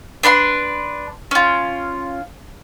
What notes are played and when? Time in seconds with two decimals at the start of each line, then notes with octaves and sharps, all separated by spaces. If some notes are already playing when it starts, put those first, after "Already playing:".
0.23 D4 B4 B5 C6
1.31 C#4 F4